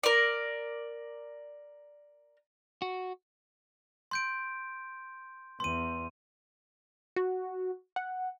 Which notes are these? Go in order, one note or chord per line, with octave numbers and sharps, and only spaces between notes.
A#4 D5
F#4
C6 G6 D7
E2 C6 D#7
F#4
F#5